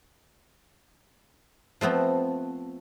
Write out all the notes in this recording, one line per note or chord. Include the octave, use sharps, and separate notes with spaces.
F3 A3 B3 C4